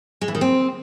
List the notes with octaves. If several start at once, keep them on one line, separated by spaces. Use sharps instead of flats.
G#3
E3
D#3
C4